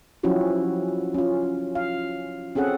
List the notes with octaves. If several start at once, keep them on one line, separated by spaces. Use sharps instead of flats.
F3 F#3 C#4 E4 F#4 G4
C#4 F4
F5
C4 C#4 G#4 A4 F#5